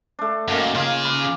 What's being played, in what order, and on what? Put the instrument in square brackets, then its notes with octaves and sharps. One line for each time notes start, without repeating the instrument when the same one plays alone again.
[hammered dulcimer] A3 D4
[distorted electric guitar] F#2 [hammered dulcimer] D#3 A#3 A#5
[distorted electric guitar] C#3 G#4 [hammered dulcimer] F4 A#4
[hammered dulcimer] B4 A#5 D6